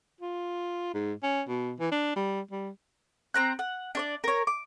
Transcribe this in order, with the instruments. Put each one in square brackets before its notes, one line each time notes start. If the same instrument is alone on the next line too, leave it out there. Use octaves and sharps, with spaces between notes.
[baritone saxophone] F4
G#2
C#4
B2
E3
D4
G3
G3
[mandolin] C4 A#5 F#6
F#5
D4 C#5 D5
A#4 C#5
D6